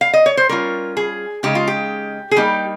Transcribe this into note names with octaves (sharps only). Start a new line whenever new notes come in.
F5
D#5
C#5
C5
G3 C#4 F4 A#4
G#4
C#3 G#3 D#4 G4
F4
G4
G#4
G3 A#3 D#4 G4